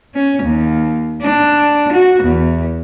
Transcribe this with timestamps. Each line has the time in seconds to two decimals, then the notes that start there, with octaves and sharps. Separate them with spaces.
0.14 C#4
0.43 D#2
1.23 D4
1.93 F#4
2.23 E2